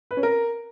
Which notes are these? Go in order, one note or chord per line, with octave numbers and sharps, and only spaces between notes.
B4
C#4
A#4